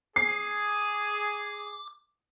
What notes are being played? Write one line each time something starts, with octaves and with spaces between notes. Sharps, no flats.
G#4 D6 C7